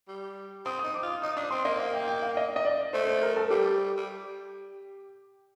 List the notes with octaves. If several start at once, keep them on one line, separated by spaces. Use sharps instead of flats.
G3
C4 D#6
D#4 D#6
D6
F4
D#4 D#6
D4 D#6
C4 C6
A#3 D#5
F5
G5
G5
F5
D#5
D#5
D5
A3 C5
C5
A#4
A4
G3 G4
G3